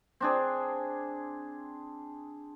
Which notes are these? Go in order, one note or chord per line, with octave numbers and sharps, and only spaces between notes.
C4 D4 G#4